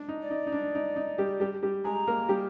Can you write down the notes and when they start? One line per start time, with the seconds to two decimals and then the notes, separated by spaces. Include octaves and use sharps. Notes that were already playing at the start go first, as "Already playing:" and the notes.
Already playing: D4
0.09 D#4
0.22 D5
0.30 D#4
0.47 D#4
0.52 D4
0.75 D#4
0.96 D#4
1.18 G3 G4
1.40 G3 G4
1.63 G3 G4
1.84 G#3 G#4 A#5
2.07 A#3 A#4
2.29 G3 G4